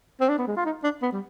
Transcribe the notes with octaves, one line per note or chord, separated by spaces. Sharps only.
C4
D4
B3
G#3
F4
D#4
D4
B3
G3